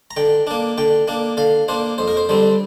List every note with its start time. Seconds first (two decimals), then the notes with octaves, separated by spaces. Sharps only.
0.11 A#5
0.16 D3 G5
0.47 A#3 D4
0.78 D3 G5
1.08 A#3 D4
1.37 D3 F5
1.68 A#3 D4 C5
1.98 F2 C5
2.08 A#4
2.17 C5
2.29 D3 G3 C4